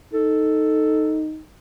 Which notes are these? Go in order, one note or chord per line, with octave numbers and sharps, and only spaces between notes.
D#4 A4